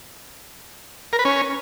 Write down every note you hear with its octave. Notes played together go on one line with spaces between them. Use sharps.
A#4
B4
C#4